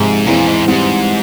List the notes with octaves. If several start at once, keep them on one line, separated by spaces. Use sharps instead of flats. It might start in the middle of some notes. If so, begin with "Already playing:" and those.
Already playing: G#2 C3 F3 G#3
E2 A#2 E3 G#3 C4 E4
G#2
G#2 E3 G3 C4